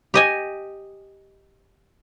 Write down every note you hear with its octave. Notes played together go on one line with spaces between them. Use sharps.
G4 D#5 G#5